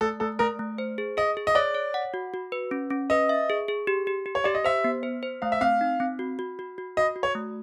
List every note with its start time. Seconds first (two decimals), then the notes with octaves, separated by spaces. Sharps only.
0.01 A3 A4
0.20 A3 A4
0.39 A3 A#4
0.59 A3
0.78 C5
0.98 G#4
1.17 G#4 D#5
1.37 G#4
1.47 D#5
1.55 C#5 D5
1.74 C#5
1.94 F#5
2.14 F#4
2.34 F#4
2.52 B4
2.71 C#4
2.90 C#4
3.10 B4 D#5
3.29 E5
3.50 G#4
3.68 G#4
3.87 G4
4.07 G4
4.26 G4
4.35 C#5
4.44 G4 D5
4.55 D#5
4.64 C5 E5
4.84 B3
5.03 C5
5.23 C5
5.42 A3 F5
5.52 E5
5.61 C4 F5
5.81 D#4
6.00 C4
6.19 F#4
6.39 F#4
6.59 F#4
6.78 F#4
6.97 F#4 D#5
7.16 F#4
7.23 C#5
7.35 A3